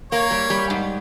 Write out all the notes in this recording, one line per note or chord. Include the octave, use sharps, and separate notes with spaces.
A#3 C#5
G3
G3
G#2